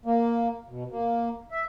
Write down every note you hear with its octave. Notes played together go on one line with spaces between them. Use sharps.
A#3
B2
A#3
E5